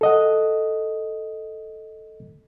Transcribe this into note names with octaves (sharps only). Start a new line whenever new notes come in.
A4 D#5 F#5